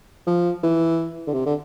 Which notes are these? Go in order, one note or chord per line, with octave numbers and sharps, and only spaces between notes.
F3
E3
D3
C3
D3